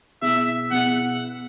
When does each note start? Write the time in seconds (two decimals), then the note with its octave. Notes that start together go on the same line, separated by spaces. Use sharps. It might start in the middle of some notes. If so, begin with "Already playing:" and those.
0.22 B2 B3 E4 G#4 E5
0.71 B2 B3 E4 G#4 F#5